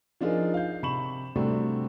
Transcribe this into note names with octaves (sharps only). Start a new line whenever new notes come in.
F3 D4 D#4 F4 G#4 A#4
F5 G6
C3 B5 C#6 E7 F#7
C3 G3 A3 C4 D4 F#4